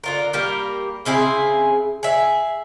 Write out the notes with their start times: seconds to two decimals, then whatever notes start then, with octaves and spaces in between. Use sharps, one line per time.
0.04 D3 F4 A#4
0.33 G3 A#3 G4 A#4
1.05 C#3 C4 E4 G#4
2.03 G#4 E5